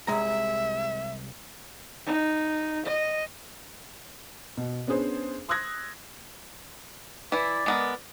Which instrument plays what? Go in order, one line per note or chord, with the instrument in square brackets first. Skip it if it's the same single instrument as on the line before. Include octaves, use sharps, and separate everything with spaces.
[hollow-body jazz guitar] C2 G#3 A#5 [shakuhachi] E5
[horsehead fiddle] D#4
D#5
[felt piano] B2
B3 C#4 D4 G#4 C5
C6 D#6 E6 F#6 G#6 A#6
[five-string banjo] E3 E4 [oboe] D5
[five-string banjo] G#3 B3 A#4